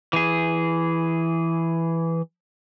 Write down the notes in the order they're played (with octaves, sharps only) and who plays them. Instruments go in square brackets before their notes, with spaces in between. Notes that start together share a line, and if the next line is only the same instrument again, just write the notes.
[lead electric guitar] E3 G#4